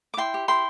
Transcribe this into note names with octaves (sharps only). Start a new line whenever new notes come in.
D6
E4 G5 C6
G4
E4 G5 C6